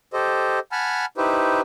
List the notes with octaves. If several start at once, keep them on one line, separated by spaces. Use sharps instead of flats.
G4 A4 C5 D#5
F#5 G#5 A5 B5 F6
D#4 E4 G4 B4 C5